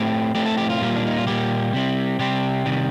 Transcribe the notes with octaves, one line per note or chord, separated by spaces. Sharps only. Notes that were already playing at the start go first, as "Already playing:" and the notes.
Already playing: A2 A3 C4 G4
A2 A3 C4 G4
A4
G4
F4
A#2 G3 A#3
D4
D#4
F4
A#2 G3 A#3 G4
C3 G3 C4
C3 G3 C4 G4
C3 D#3 G3